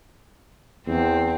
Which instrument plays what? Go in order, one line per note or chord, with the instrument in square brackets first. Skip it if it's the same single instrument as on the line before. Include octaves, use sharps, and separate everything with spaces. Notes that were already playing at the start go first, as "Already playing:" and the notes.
[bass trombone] E2 [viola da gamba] C4